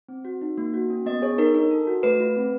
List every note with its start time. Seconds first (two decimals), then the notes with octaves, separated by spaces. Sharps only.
0.09 C4
0.25 F#4
0.42 D#4
0.58 A#3
0.74 F#4
0.90 C#4
1.06 B3 D#5
1.22 G#4 C#5
1.38 D#4 A#4
1.55 D4 A#4
1.71 A4
1.87 F#4
2.03 A3 B4
2.20 F4
2.36 C4